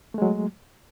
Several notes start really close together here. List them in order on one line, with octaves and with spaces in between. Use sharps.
A3 G#3 F#3